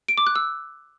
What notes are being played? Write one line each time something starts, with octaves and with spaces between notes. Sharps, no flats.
D7
D6
F#6
E6